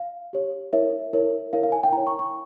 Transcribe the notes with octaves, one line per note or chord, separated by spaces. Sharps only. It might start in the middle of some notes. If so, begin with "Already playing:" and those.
Already playing: F5
G4 C#5
E4 A#4 C#5 E5
E4 A#4 C#5
E4 A#4 C#5 F5
F5
G#5
G5
E4 A#4 C#5 A#5
C#6
C#6